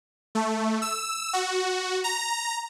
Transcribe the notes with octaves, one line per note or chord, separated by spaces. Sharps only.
A3
E6
F#4
A#5